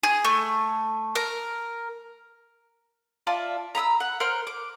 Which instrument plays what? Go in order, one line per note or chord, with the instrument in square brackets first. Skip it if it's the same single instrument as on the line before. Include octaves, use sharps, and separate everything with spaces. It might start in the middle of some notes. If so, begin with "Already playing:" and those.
[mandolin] G#4
A3
A#4
F4 D5 E5 A5
A#5 B5 D#6 E6
F#5
A#4 C5 F#5 F6
D6